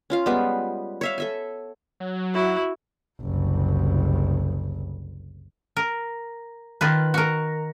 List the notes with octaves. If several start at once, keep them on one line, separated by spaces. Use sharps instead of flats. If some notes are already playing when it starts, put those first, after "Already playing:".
C#4 F4 F5
G3 G#3 B3 B4
C#5 E5 F5
A4 E5 G#5
F#3
E4 F#4
F#1 C2
A#4
D#3 F4 B4
F#4 A#4